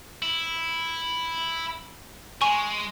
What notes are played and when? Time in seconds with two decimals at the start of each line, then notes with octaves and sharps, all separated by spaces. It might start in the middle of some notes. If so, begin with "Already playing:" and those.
0.22 E4
2.41 G#3 G#5 C#6